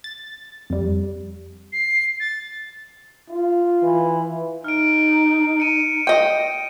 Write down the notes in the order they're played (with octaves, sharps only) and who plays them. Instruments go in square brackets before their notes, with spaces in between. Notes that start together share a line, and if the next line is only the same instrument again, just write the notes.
[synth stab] A6
F2 G3
[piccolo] C7
A6
[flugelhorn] F4
[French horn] E3
[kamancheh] D#4 [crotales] F6 D7
[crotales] C#7 D#7
[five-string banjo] D#5 G5